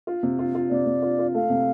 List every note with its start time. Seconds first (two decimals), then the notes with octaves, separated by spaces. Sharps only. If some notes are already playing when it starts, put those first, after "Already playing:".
0.07 F4
0.23 C3
0.39 F4
0.55 F4
0.70 C3 D5
0.86 C3
1.02 F4
1.19 F4
1.34 A3 F5
1.50 C3